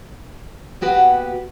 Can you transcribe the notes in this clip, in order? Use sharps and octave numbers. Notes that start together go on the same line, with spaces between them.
A#3 B3 F#4 G4 B4